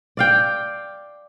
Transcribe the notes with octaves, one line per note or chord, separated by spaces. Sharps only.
D5 F5 G5